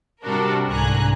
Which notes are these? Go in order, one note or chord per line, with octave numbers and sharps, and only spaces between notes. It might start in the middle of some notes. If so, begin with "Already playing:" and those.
C3 G3 D4 F#4 A4 A#4
C2 G#2 D3 G#5 A#5 F#6